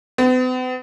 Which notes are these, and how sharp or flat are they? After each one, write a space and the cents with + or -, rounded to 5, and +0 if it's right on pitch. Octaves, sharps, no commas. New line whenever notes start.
B3 +45